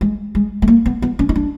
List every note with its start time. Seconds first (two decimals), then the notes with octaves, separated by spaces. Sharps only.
0.01 G#3
0.35 G#3
0.62 A3
0.68 A#3
0.86 B3
1.02 B3
1.19 C#4
1.29 D#4
1.36 D4